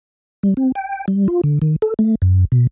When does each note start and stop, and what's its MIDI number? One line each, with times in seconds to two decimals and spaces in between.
0.43 0.54 55
0.57 0.72 60
0.75 1.05 79
1.08 1.28 55
1.28 1.41 65
1.44 1.59 50
1.62 1.76 51
1.82 1.94 69
1.99 2.15 57
2.22 2.45 42
2.52 2.67 47